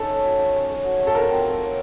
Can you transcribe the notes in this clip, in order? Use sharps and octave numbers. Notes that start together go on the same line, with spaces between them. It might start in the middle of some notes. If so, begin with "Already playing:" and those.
Already playing: C#4 D#4 A4
A3
F#4
A3
C#4
A3
F#4
A3
A4
F4 A#4
C4
A4
C#5